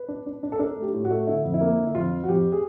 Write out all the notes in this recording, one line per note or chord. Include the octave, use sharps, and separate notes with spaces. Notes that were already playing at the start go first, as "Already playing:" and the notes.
Already playing: B4
D4
D4
D4
A4
D4 A#4
A3
G4
A2
F#4
A3
D3 E4
F2
E4
A#3
D3
E4
F2 F4
F3
F#4
F2 G4
G#4